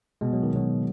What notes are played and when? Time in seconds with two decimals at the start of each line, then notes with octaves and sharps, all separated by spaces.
0.21 B2 G#3
0.33 F#3
0.43 D#3
0.53 B2 F#3